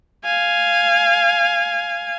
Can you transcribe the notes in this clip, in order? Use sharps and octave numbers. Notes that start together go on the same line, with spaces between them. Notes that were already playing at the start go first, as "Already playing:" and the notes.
F5 G#5